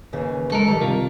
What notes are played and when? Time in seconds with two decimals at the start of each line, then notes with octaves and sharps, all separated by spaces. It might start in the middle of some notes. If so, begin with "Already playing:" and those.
0.13 D#2 C#3 E3
0.52 G#3 A4 A#4 A5
0.68 D#3 G3
0.81 C3 F4